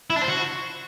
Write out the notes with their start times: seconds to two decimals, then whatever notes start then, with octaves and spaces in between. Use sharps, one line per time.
0.10 E4
0.16 D4
0.22 C5
0.28 F#4